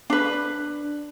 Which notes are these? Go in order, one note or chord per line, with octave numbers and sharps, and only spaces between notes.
D4 B4